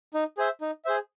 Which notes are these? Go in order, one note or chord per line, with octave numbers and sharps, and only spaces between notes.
D#4
G#4 C5 E5
D#4
G#4 C5 E5